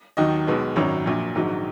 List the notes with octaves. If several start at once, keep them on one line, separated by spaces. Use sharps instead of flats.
D#2 D#3 F#3 D#5
B1 B2 G#3
G#1 F#2 D#3 F#3 C#5
A#1 A#2 F#3
A#1 G#2 D#3 F#3